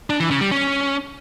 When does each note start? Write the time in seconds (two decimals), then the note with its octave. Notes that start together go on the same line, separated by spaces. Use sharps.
0.10 D4
0.20 E3
0.31 C#3
0.41 G3
0.51 C#4